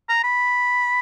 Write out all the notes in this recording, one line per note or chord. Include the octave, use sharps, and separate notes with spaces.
A#5
B5